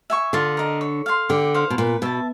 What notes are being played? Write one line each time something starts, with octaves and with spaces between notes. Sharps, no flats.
E5 G#5 C#6
D3 F4
A#4 D#5
C#5
F5 G#5 C6
D3 G4
C5 F5
B2
A#2 B4
B2 E5 A5